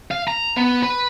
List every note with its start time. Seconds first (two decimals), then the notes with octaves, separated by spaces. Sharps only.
0.11 F5
0.28 A#5
0.57 B3
0.83 B4